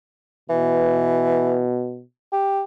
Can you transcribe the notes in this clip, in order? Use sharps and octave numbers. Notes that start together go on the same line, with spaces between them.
B2 E3
G4